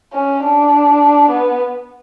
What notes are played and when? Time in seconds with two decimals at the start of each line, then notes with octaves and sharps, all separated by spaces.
0.13 C#4
0.43 D4
1.30 B3